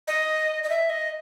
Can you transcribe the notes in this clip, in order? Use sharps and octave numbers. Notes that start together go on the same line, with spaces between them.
D#5
D#5
E5
D#5